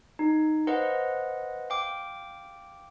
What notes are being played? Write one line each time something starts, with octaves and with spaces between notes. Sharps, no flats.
D#4
B4 C5 D#5 F5 F#5
F5 G5 D6